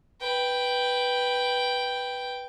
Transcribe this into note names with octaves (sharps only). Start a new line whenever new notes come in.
B4 G5